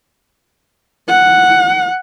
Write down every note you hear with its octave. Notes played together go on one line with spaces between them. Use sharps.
F#5